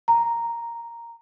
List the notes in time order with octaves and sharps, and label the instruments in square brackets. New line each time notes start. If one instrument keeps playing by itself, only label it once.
[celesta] A#5